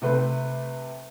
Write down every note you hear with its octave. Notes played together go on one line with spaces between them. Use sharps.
C3 A3 C4 B4